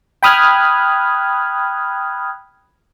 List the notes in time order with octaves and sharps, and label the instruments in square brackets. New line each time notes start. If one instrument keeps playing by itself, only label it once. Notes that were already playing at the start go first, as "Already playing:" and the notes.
[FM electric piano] G5 B5 D#6 F6 F#6 G#6